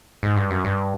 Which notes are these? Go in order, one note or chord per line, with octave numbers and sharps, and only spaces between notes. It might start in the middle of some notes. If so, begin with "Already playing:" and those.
G#2
G2
F#2
G2